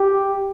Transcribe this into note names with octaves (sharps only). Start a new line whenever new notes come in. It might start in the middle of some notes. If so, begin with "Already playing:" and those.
Already playing: G4